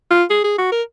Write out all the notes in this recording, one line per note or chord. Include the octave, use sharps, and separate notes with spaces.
F4
G#4
G#4
F#4
A#4